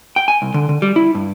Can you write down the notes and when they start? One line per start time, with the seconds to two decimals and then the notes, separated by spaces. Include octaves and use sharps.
0.16 G5
0.28 G#5
0.42 C2
0.54 D3
0.69 D3
0.82 G3
0.96 E4
1.15 G2